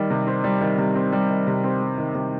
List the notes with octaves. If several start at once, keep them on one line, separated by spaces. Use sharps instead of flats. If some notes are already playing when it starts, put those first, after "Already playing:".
Already playing: D#3 G3
C3
C4
G3
D#3
C3
C4
G3
D#3
C3
C4
G3
D#3
C3